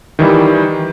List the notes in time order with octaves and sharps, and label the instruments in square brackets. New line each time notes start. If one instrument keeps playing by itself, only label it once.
[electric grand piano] D#3 E3 G3